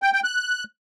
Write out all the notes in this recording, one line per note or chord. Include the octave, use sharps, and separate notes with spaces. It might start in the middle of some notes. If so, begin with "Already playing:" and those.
G5
G5
F#6